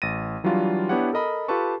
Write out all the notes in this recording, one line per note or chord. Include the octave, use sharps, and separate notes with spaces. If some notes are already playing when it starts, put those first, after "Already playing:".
A1 A6 A#6 D#7
E3 F#3 G3 D4 F4 F#4
B3 D4 E4 G4 C#5 F#5
A4 A#4 D#5 B5
F4 G4 A4 B4 A5 C#6